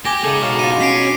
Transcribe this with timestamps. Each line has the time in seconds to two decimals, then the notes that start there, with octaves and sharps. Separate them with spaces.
0.05 G4 G#5 D6 A#6
0.24 C#3 D#4 G#4 A4
0.42 B2 C#5 E5 F5
0.59 E4 F4 D#7
0.81 C#4 B6 C7 D7